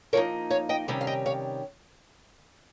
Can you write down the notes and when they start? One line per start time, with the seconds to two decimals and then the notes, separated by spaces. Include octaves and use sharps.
0.13 F3 A#3 D#4 A#4 C#5
0.50 C#5 F5
0.69 D#5 G5
0.88 C3 D#3 G3 C#4
1.01 F5
1.07 D#5 G5
1.26 C#5 F5